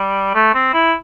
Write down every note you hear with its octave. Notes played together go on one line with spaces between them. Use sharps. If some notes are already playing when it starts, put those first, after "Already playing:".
Already playing: G3
A3
C4
E4